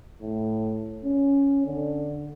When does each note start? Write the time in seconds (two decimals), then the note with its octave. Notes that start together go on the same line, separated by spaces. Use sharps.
0.22 A2
1.05 C#4
1.66 D3